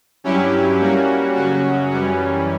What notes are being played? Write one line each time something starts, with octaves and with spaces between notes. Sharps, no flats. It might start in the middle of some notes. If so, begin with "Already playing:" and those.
G2 F#3 C#4 E4 G4
G3 A#3 C#4 F#4
F#2 C#3 F#3 C#4 F#4
F#2 E3 G3 C#4